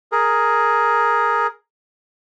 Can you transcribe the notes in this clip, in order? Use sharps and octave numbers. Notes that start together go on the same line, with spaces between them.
G#4 A#4